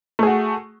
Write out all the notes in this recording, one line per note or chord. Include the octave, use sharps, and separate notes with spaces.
A3 F#4 G#4